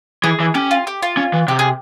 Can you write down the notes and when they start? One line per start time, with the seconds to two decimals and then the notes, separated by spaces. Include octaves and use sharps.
0.24 E3 G#4
0.40 E3
0.55 C#4 G4
0.71 F4
0.87 G4
1.02 F4
1.17 C#4
1.33 E3
1.48 C3 G4
1.59 G#4